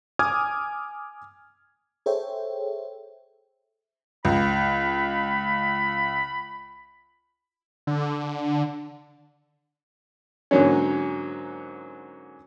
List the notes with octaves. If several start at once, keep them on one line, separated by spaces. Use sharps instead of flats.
G#5 D6 D#6 F6 G#6
G#4 A4 C5 C#5 E5 G5
C#2 B5
D3
G#2 D3 F#3 A#3 C#4